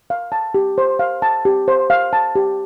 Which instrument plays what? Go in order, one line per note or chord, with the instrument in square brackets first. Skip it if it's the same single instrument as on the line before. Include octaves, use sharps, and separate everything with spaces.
[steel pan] F5
A5
G4
C5
F5
A5
G4
C5
F5
A5
G4